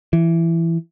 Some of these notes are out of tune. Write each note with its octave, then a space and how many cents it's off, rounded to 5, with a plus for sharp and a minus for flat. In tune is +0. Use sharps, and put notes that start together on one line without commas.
E3 +10